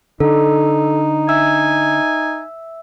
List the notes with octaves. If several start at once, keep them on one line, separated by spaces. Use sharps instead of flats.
D3 D#4 A4
E5 G#5 E6